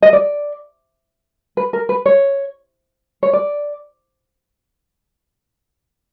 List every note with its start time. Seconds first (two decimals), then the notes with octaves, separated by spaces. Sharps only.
0.02 D#5
0.13 D5
1.57 B4
1.73 A#4
1.89 B4
2.06 C#5
3.23 C#5
3.33 D5